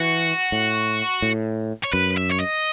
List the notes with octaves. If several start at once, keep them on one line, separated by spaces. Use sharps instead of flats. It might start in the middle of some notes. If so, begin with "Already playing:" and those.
Already playing: E3 F#4
A2
A2
C#5
F#2 B4
E5
C#5
D#5